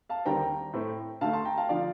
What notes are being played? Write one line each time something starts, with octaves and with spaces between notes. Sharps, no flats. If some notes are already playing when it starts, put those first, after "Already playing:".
F5 A5
D#2 D3 G3 C4 G5 A#5
A2 A3 C4
D2 D3 A3 F5 A5
A5 C6
G5 A#5
F5 A5
D3 F3 D5 F5